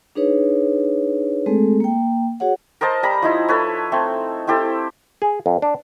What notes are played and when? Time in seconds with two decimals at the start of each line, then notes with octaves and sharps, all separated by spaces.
0.15 D4 D#4 G#4 B4 C#5
1.46 G#3 A3 C4 G#4 A4
1.80 A#3 G5
2.40 F#4 G#4 C#5 F#5
2.81 A#4 C5 D#5 A5
3.03 G3 A#5 B5
3.22 F3 D#4 E4
3.49 A4 B4 C#5
3.92 A3 C4
4.47 C4 E4 G4 A4
5.22 G#4
5.46 F2
5.62 D4